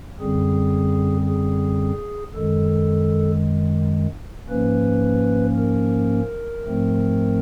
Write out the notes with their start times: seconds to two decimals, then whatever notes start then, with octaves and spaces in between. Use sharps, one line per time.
0.20 F#2 D3 G3 C4 G#4
1.27 G#4
2.35 F#2 D#3 G#3 A4
4.49 G#2 F3 A#3 C#4 B4
5.57 A#4
6.65 G#2 F3 A3 C4